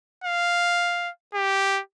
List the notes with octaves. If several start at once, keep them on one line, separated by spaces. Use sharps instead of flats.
F5
G4